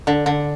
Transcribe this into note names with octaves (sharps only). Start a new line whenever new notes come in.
D3
D3